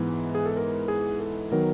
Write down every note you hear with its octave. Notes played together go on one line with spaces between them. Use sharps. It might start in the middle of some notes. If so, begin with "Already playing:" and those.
Already playing: G#2 E3 G#3 B3
G#4
A4
A#4
G#4
A4
D#3 F#3 B3 A#4